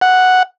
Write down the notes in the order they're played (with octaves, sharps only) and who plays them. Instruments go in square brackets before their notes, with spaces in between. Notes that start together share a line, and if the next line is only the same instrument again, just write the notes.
[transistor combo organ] F#5